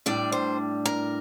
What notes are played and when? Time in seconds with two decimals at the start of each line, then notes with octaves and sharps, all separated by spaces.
0.06 A2 G3 D4 D5
0.32 C5
0.85 A#4